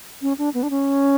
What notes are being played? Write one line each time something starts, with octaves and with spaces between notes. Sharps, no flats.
C#4
D4
B3
D4
C#4